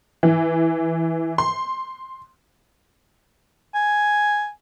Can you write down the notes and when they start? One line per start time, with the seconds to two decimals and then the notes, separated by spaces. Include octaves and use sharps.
0.23 E3
1.38 C6
3.75 G#5